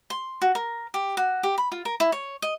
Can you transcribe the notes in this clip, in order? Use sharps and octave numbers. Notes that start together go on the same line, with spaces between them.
C6
F#4
A#4
G4
F#4
G4
B5
F4
A#4
E4
C#5
D#5